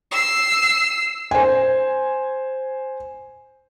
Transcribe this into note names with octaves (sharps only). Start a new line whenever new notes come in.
E6 C7
C5 G#5